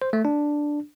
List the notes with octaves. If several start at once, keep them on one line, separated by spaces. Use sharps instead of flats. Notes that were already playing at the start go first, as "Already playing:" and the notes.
C5
A3
D4